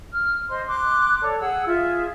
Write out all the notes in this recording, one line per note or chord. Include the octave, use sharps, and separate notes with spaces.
F6
C5 D#5 C6
C6 D6 F#6
A4 C#5 D5
G#4 F#5 E6
F4 G#4 E5